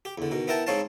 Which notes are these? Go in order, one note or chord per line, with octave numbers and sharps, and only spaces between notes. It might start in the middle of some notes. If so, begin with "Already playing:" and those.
G4
E2 D3
B2 D#3
B3 E4 A#4 G5 A5
G#2 C4 D#4 C#5 F5 A5